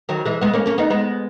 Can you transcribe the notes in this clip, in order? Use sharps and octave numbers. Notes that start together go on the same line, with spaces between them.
D#3 F#3
E3 G#3
G#3 B3
A#3 C#4
A#3 C#4
B3 D#4
G#3 B3